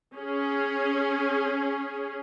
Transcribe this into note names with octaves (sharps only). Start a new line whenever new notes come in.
C#4 G#4